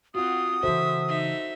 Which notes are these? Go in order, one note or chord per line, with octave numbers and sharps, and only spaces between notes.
C4 F4 F#4 F#5 D#6
C#3 E3 F#4 A4 C5 E5
D#4 E5